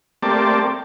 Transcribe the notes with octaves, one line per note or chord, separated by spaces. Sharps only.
A3 A#3 C4 G4 D5 A5